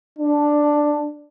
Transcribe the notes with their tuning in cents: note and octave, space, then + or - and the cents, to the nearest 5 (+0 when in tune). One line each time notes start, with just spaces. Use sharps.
D4 +5